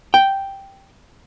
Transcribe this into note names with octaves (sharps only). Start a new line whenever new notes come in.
G5